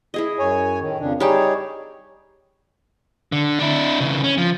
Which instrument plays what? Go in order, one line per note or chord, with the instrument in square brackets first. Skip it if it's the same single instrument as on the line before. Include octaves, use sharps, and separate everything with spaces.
[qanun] E4 G#4 D#5
[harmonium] F#2 C#5 G#5
A2 D#3
F2 C#3 D4
[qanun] G3 G5 A5 [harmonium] D#4 G#4 C#5
[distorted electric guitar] D3
D4 E4
C#3 E3
C#4
F3